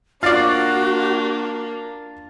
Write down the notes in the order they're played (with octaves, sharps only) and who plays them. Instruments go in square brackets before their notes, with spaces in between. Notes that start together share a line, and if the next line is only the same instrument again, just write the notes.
[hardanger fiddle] A#3 D4 [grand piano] F4 A6 C7 [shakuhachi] F#4 [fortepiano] D5 F5